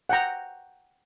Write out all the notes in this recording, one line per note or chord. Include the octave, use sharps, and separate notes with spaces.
F#5 G5 A#5